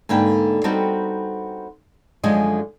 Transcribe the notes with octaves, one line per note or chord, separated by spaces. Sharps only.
G#2 D3 A#3 B4 G5
G3 B3 C4 D#4 F#4 A4
F#2 D3 F3 G#3 G#4 D#5